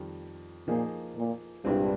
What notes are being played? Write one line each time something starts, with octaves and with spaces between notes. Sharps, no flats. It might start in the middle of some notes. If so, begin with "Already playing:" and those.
Already playing: F2 D#3 G3
A#2 F3 A#3 D#4 G#4
A#2
C2 G2 A#2 G#3 C4